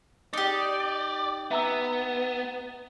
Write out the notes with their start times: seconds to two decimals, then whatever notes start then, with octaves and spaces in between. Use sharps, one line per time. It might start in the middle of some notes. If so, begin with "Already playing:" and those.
0.33 D#4 G4 D5
1.51 B3 E5 A#5 E6